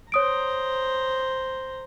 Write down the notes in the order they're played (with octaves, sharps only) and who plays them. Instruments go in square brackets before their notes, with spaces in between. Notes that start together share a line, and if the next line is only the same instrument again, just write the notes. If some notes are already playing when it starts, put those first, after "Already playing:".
[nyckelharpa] C5 A#5 [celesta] C#5 D#6 D7